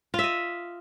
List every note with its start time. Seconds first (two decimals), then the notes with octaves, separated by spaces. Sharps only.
0.14 F4
0.19 E5
0.24 D#5